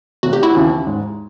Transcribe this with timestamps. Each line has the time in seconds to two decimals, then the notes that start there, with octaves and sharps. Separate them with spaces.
0.23 F1 F#4
0.33 G4
0.43 E4 F#4
0.55 D#2 C#3 E3
0.87 G#2